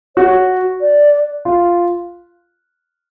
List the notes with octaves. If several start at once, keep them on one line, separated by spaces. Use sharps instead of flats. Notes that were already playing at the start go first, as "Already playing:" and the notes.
F#4 C#5
D5
F4